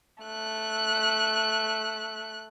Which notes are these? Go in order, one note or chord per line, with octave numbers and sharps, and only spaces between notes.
A3 F#6